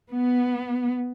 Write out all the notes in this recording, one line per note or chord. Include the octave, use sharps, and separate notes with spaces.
B3